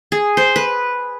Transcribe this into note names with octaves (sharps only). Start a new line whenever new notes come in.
G#4
C5
B4